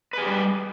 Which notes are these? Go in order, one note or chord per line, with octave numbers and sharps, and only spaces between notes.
G3 G4 G#4 B4